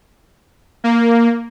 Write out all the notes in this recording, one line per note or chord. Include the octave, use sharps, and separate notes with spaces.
A#3